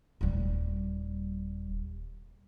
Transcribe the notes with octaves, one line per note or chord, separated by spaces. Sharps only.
D#1 G3